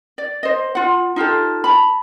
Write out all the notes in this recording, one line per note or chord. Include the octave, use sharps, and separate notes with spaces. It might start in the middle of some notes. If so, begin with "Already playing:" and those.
D5
C5 D#5
F4 F#5
D#4 F4 G4 A4
A5 B5